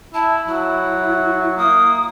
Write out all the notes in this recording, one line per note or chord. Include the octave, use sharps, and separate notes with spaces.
E4 E5 A5
F#3 E4
A#3 D#6